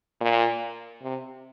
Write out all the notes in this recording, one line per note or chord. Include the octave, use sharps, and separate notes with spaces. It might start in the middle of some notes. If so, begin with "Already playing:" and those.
A#2
C3